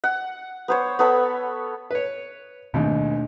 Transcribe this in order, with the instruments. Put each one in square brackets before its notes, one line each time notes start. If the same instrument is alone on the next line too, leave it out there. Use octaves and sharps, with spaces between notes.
[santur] F#5
B3 C5 C#5
B3 A4 C#5 B5
[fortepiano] B4 C#5
[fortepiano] G#1 D#2 [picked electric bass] B2 A3 D4